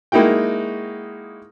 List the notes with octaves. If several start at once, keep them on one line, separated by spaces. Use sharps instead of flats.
G#3 A#3 D#4 E4 F#4 G5